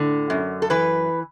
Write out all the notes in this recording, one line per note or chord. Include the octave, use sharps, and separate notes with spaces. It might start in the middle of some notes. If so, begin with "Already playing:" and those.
Already playing: A2 D3
F#2
A4
E3 B4